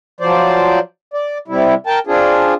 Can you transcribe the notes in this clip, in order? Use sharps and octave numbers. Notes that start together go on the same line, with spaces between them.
F3 F#3 C5 D5
D5
C3 G3 E4
A#4 G5 A5
C4 D4 F4 G#4